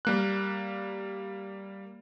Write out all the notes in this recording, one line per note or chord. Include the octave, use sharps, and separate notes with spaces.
G3 A#3 F#6